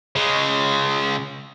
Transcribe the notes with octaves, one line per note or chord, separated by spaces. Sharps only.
C#3 G#3